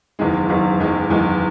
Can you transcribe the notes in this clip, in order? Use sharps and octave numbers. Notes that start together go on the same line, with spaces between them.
F#1 E2 D#3 G#3
F#1 E2 D#3 G#3
F#1 E2 D#3 G#3
F#1 E2 D#3 G#3